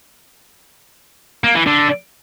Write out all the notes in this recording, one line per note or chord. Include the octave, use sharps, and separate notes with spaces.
A#3
E3
D3